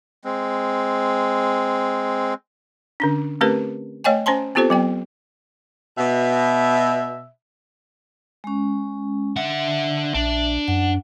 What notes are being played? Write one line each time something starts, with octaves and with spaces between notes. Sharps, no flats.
G#3 C4
D3 C#4 D4
A3 C4 C#4 G4 A#4 B4
A3 C#5 D#5 G5 G#5
C#4 C5 G#5 A5 C6
B3 C4 F4 G4 A4 C5
F#3 B3 G5
B2 E5
G#3 C#4
D3 E5 F#5
A#1 D4
F#2 F#5